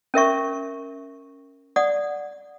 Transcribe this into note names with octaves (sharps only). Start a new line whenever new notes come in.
C#4 A#4 E5 C#6
D5 F#5 D#6